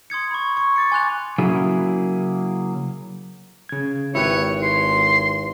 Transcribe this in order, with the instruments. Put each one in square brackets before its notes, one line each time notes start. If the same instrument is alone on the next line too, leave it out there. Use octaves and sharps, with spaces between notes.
[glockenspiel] C6 D#6 G#6 C#7
B5 C#6
C#6
D6 A6 C#7
G#5 C6 F#6 F7
[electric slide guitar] C#3 F#3 A#3 E4 G#4
[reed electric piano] C#3 G#6
[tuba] G#1 [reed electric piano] E4 G4 B4 [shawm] C#5
[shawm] C6